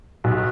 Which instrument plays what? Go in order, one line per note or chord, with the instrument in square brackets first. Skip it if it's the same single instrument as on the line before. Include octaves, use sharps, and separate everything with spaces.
[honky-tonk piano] B1